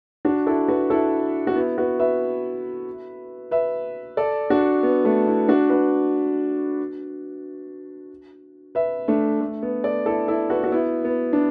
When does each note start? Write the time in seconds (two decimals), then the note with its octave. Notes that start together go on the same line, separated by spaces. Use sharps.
0.25 D4 F#4
0.46 E4 A4
0.68 F#4 B4
0.90 E4 A4
1.47 F#4
1.55 B3 E4
1.78 F#4 B4
1.99 B4 E5
3.51 B4 E5
4.17 A4 D5
4.50 D4 F#4
4.83 B3
5.04 A3 D4
5.27 B3 E4
5.48 D4 F#4
5.70 F#4 B4
8.75 B4 E5
9.08 A3 D4
9.41 A3
9.63 B3
9.84 A4 D5
10.06 E4 A4
10.28 E4 A4
10.50 F#4 B4
10.64 F#4
10.72 B3 E4
11.05 B3
11.33 D4